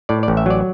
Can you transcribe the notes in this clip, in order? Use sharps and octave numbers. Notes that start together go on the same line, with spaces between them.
A2 D5
D5
A1
E5
F#3 D5